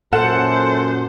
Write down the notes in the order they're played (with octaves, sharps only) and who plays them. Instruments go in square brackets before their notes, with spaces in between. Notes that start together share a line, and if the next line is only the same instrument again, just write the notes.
[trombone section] F#2 [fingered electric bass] A#2 [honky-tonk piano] A4 F#5 E7 [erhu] C5